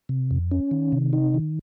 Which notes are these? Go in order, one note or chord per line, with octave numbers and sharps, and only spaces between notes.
C3
F2
C#4
D#3
C3
D#4
D#3